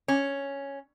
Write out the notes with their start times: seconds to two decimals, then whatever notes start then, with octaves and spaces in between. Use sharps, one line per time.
0.08 C#4